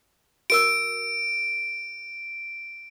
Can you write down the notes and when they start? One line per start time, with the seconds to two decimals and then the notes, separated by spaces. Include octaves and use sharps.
0.50 F#4 A#4 E6 D7